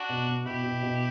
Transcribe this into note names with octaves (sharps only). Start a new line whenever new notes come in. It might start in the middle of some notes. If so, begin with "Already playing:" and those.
Already playing: D4 F#4
B2
B2
B2 E4 G4
B2
B2